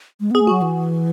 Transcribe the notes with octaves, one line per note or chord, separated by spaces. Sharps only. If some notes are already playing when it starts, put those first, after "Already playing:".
G#3
B3 G#4
A3
F#3 F#4
E3